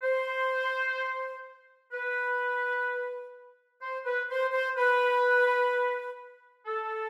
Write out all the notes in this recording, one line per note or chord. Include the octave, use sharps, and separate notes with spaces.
C5
B4
C5
B4
C5
C5
B4
A4